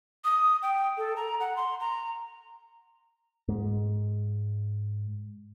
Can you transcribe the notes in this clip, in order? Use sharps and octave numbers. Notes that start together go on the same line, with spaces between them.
D#6
G5
A4
A#5
F#5
C6
A#5
G#2 G#3